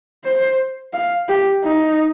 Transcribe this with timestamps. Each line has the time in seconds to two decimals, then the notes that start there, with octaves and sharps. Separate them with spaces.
0.24 C5
0.93 F5
1.28 G4
1.63 D#4